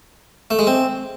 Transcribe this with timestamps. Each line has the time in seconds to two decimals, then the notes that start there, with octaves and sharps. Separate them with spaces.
0.51 A3
0.59 G#3
0.67 C4